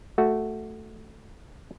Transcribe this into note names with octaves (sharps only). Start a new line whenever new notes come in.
A3 F#4